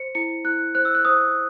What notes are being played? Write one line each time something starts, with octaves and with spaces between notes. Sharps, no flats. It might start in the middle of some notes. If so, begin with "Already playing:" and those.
Already playing: C5 C#7
E4 C#7
E4 F#6
C5 F#6
E6
F#6
C5 D#6